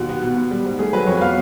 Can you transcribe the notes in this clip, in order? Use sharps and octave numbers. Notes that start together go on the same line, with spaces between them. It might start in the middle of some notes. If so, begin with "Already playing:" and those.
Already playing: D#2 B2
B3
B2
B3
G3
G#2
A3 G#4
F#3 B4
F2 C#5
B3 F5